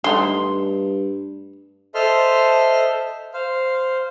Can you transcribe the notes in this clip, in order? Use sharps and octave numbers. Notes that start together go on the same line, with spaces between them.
G2 D3 A3 D#4 C6
A4 C5 D#5 E5 C6 F6
C5 F5